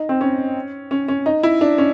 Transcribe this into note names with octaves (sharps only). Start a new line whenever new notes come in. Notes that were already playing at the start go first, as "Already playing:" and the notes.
Already playing: D#4
C4
C#4
C#4
C#4
D#4
E4
D4
C#4